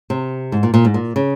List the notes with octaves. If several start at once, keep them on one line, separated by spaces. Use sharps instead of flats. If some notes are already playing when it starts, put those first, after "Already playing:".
C3
G#2
A#2
A#2
G#2
A#2
C#3